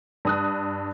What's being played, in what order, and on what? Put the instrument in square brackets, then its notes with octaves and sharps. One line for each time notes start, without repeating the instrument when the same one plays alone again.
[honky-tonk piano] G2 D#6 F#6